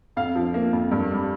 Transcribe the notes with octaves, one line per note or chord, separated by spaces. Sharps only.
F2 F5
F3
A#3
F2
G2
G3